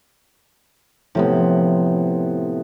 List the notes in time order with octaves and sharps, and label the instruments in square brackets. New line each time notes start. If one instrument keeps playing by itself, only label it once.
[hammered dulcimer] A2 C3 B3 [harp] F3